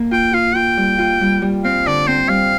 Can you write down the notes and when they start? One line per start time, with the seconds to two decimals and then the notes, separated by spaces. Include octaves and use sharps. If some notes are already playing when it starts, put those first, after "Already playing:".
Already playing: A#3
0.11 F4 G5
0.33 F4 F5
0.55 F4 G5
0.77 G3
0.98 F4
1.21 G3
1.42 G3
1.64 C4 F5
1.86 D3 D5
2.07 C4 C5
2.29 G3 F5